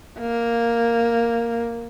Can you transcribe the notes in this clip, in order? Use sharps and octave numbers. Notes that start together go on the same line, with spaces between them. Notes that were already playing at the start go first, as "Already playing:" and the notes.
A#3